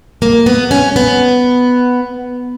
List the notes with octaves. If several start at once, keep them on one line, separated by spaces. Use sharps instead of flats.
A#3
B3
C#4
B3